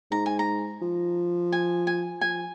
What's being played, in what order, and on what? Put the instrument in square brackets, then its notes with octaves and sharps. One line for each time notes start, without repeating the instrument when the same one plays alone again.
[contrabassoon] G#2 [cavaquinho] A#5
[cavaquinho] G#5
A#5
[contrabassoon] F3
[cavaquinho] G#5
G#5
[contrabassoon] F3 [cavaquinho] G#5